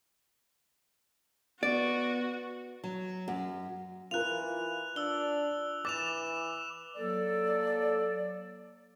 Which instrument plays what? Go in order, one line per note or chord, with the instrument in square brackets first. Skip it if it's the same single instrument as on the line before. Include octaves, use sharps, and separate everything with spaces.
[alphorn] B3 [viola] F#4 [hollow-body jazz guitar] D5
[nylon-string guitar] F#3
F#2
[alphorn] E3 [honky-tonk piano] F4 A#4 [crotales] F#6 F7
[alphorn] D4 [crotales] E6 G7
[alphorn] E3 [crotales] D6 E7 F7 [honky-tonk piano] A6
[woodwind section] F#3 A#3 A4 D5